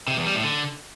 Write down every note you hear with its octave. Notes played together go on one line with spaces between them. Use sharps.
C3
E2
G3
A2
D3